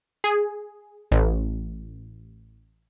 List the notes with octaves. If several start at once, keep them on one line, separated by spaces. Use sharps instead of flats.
G#4
A1